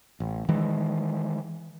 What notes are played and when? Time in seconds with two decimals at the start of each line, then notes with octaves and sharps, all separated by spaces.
0.20 A1
0.49 D#3 E3 G#3